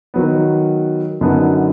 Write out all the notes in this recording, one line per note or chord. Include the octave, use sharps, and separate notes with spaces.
D#3 F#3 B3
F#2 D3 F#3 B3 D#4